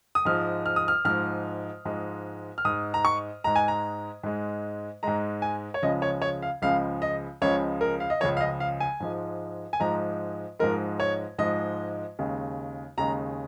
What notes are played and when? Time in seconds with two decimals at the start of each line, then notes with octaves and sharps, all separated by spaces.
0.15 D#6
0.25 G#2 F3 G#3 F6
0.66 F6
0.76 D#6
0.88 F6
1.05 G#2 F3 G#3 F6
1.85 G#2 F3 G#3
2.58 F6
2.65 G#2 G#3 D#6
2.94 A#5
3.05 C#6
3.44 G#2 G#3 A#5
3.56 G#5
3.68 A#5
4.23 G#2 G#3
5.03 G#2 G#3 A#5
5.42 G#5
5.74 C#5
5.82 C#2 C#3 F3 G#3 D#5
6.02 C#5
6.22 C#5
6.42 F5
6.62 C#2 C#3 F3 G#3 F5
7.02 D#5
7.42 C#2 C#3 F3 G#3 C#5
7.81 A#4
8.00 F5
8.10 D#5
8.20 C#2 C#3 F3 G#3 C#5
8.37 F5
8.41 D#5
8.60 F5
8.80 G#5
9.00 G#2 F3 G#3
9.73 G#5
9.80 G#2 F3 G#3 A#5
10.59 G#2 F3 G#3 A#4
11.00 C#5
11.39 G#2 F3 G#3 D#5
12.19 D#2 C#3 G#3
12.97 D#2 C#3 G#3 A#5